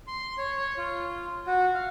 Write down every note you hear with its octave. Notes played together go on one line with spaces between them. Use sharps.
C6
C#5
C#5
F4
F#4
F5